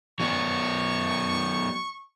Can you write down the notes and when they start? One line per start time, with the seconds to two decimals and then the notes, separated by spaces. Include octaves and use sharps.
0.20 F#3 B3 D5 C#6